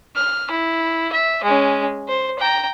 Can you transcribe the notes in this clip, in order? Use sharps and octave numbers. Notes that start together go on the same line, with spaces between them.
F6
E4
E5
G#3 C#4
C5
G5 A#5